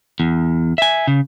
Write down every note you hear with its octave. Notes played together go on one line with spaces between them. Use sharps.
E2
E5 G#5
C#3